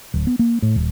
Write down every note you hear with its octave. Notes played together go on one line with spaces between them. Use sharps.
D1
B3
A#3
A2
D#1